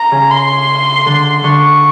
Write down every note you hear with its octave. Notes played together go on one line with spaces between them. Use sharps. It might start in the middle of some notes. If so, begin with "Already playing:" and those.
Already playing: A#5
C#3
C6
D3
D3 C#6